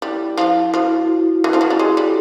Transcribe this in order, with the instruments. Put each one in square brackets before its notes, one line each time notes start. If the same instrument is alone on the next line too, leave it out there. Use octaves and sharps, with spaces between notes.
[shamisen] G3 [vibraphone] E4
[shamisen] F3
[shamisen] F3 [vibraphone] E4 F#4
[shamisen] E3
F3
F#3
G3
[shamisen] G#3 [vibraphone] F#4 G#4
[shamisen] G3 [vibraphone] G4 A4